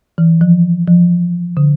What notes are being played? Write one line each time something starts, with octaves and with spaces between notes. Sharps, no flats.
E3
F3
F3
D3